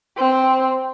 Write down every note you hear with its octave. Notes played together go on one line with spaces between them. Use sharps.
C4